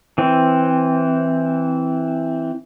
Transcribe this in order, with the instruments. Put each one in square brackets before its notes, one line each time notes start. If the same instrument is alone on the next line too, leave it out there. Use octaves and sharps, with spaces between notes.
[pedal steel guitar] E3 C4